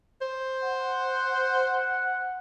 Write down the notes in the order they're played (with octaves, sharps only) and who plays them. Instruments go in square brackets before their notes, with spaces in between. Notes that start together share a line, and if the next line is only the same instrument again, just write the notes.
[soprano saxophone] C5
[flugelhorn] F#5